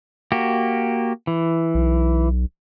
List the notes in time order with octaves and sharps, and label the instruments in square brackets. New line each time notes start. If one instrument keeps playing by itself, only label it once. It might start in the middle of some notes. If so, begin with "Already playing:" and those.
[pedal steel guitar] A#3 F#4 G4
E3
[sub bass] B1